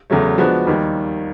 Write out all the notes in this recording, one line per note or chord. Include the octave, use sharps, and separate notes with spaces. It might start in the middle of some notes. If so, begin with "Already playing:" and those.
E2 C#3 F#3 A3
F3 G#3 B3 D4 F#4
D#2 D#3 G3